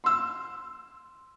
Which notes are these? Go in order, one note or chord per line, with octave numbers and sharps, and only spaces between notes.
C6 E6